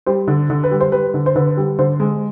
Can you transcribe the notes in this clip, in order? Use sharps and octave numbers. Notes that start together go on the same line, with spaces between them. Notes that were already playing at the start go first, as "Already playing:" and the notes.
G3 C5
D3
D3
B4
G3
C5
G3 B4
D3
C5
D3 B4
G3
D3 C5
G#3